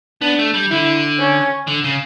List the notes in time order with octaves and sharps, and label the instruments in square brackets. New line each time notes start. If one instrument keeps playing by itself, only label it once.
[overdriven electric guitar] B3 [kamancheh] D4
[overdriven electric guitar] A3
G3
[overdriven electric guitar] D3 [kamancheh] E4
[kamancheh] C#4
[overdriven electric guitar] D3
C#3